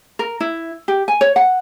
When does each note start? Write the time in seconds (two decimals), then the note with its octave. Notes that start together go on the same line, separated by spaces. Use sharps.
0.19 A#4
0.40 E4
0.88 G4
1.08 G#5
1.21 C#5
1.36 F#5